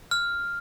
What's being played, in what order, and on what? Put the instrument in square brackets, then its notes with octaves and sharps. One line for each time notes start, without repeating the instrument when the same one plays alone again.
[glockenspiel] F6